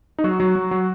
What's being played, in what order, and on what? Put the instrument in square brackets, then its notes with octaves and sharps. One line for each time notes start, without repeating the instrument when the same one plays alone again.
[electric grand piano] D#4
F#3 F#4
F#3
F#3
F#3